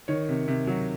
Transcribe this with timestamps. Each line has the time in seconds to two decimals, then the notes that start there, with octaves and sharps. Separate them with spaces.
0.08 D#3 C#5
0.29 C3
0.48 C3
0.67 F#3